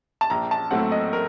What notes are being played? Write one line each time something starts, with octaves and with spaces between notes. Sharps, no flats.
A5
A#1 A#5
A5
A2 F#3 A3 C4 F#5
D#5
A#4